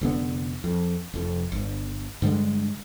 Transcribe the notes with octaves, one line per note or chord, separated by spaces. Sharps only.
F1 D3 B3
F2
F1 F2
G1
G2 D3 G3 G#3